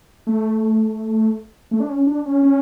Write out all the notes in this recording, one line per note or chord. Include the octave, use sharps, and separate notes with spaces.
A3
A3
D4
C#4
D4
C#4
C#4